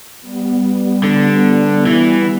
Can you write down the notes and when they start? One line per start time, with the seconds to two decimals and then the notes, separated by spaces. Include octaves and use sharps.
0.22 G3 B3
0.63 G3 B3
1.04 D3
1.86 E3